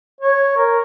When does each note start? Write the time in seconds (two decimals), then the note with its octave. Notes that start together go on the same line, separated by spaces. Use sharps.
0.20 C#5
0.57 A#4